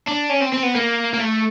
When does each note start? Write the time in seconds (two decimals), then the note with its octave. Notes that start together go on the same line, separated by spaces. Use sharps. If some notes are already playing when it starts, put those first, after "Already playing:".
0.08 D4
0.31 C#4
0.42 C4
0.54 C4
0.64 B3
0.76 A#3
1.14 A#3
1.20 A3